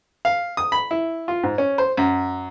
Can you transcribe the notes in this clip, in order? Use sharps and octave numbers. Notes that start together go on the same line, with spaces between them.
F5
D#6
B5
E4
F4
G#2
C#4
C5
F#2